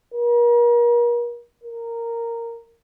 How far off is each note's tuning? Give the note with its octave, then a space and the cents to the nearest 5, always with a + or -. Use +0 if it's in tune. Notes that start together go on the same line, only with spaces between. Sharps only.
A#4 +40
A#4 -10